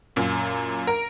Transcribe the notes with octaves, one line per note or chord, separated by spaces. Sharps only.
F#2 A#2
A#4